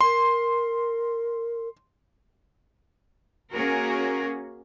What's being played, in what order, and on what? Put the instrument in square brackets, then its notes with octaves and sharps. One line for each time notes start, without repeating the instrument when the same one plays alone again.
[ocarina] A#4 [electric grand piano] C6
[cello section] A#3 C#4 F#4 G#4 A#4